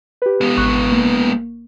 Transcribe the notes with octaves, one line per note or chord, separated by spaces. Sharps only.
G4 B4
G#3 B3
G#1 C#6 F#6
A#3